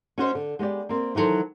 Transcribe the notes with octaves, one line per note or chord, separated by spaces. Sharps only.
C#4 F#4 C5 D#5
D3
G#3 B3 G4 D5
A#3 C4
D#3 E3 F#3 A4 C5